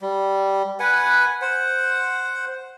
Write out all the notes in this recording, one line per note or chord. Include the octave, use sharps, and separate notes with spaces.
G3
B4 F#5 G#5
C5 F#5